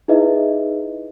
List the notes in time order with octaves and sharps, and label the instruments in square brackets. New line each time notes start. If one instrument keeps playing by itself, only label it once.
[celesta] D#4 E4 G#4 B4 D#5 E5